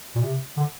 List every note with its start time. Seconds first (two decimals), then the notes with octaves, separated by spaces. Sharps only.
0.16 A#2
0.21 C3
0.57 D3